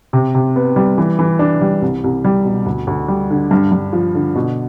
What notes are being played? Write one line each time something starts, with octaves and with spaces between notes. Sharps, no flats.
C3
C3
B3
G3
E3
E3
D4
G3
C2
C2
G3
B2
D2
D2
G3
D3
G2
G2
F3
D3
B2